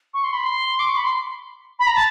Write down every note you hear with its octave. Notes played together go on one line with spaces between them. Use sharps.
C#6
C6
B5
C6
D6
C#6
B5
C6
B5
A#5
A5